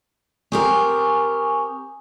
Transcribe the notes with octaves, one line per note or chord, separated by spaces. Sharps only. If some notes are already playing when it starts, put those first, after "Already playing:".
C4 G4 A#4 G#5 C#6 D#6